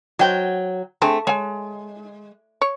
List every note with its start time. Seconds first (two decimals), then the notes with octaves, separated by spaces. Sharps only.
0.19 F#3 C5 D#5 G5
1.02 A3 C4 D4 G#4
1.27 G#3 C#5 G#5
2.62 C#5